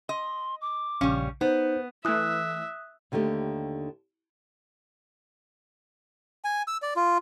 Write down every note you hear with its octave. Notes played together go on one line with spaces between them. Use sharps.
D#5 C6
D6
A#1 C#3 G3 C#4 F5
B3 D#4 C5
E3 A3 E5 D#6 F#6
D#2 D3 D#3 A3 G4
G#5
E6
D5
F4